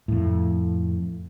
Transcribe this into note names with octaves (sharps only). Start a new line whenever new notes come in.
F2 A2